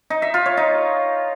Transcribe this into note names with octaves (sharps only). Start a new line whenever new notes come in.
D#4
E5
F4
C#5
D#4